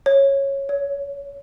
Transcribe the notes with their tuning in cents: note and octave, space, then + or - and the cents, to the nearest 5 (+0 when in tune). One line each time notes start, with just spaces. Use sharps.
C#5 -10
C#5 +25